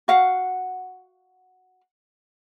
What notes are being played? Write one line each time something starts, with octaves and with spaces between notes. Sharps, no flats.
F#4 F5 F#5